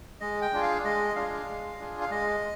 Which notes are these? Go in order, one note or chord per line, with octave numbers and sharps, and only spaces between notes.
G#3 D#5
G5
D4 F4 G#4
F5
G#3 D#5
D4 F4 G#4 F5
G#3
D4 F4 G#4
F5
G#3 D#5